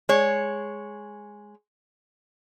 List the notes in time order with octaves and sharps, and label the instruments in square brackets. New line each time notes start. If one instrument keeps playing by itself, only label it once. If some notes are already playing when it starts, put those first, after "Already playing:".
[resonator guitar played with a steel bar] G#3 C#5